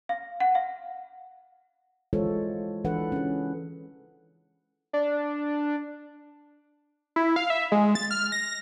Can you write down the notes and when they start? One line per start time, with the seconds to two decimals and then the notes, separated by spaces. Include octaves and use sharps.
0.09 F5
0.40 F#5
0.55 F5
2.13 E3 G#3 F4 A4 C5 C#5
2.85 E3 D4 A4 B4 F#5
3.12 C#4 G#4
4.93 D4
7.16 E4
7.36 F5
7.50 E5
7.72 G#3
7.95 A6
8.11 F6
8.32 A#6